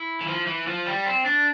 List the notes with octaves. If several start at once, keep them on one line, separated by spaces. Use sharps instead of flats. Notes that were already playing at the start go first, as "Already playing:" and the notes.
Already playing: E4
E3
F3
E3
F3
G3
C4
D4